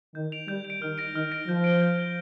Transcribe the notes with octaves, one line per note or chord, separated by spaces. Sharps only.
D#3 G6
D7 F7
G3 G6
F7
D7
D#3 F6
A#6 D7
D#3 F6
A#6 D7
F3 G6
D7 G7
G6
D7 G7